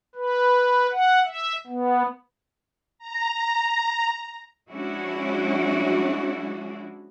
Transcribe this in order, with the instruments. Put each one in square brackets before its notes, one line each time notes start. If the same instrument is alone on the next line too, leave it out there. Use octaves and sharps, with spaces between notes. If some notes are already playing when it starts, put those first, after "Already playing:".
[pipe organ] B4
F#5
E5
B3
[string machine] A#5
[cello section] F3 G#3 C#4 D4 E4 F#4